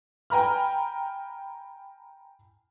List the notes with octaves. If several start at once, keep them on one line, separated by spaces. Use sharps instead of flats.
G5 G#5 A#5 B5 F6